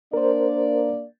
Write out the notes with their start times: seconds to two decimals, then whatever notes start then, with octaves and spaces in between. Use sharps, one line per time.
0.14 A#3 D4 A#4 C5 D5